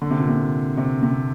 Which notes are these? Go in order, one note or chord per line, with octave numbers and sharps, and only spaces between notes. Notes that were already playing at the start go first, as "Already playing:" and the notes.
D3
C3
A#2
C3
C3
C3